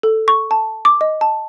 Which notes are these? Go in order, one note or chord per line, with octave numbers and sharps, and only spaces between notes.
A4
C#6
A5
D6
D#5
A5